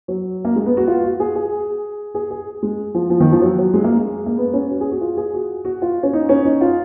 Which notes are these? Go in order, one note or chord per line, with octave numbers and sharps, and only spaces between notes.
F#3
A#3
G#3
B3
F#4
F4
F#4
G#4
G#4
G#4
G#4
G#3
F3
F3
D#3
F3
F#3
F#3
G#3
A#3
G#3
A#3
B3
C#4
F#4
G#4
F#4
F4
G#4
F#4
F#4
F4
C#4
D#4
C#4
D#4
F4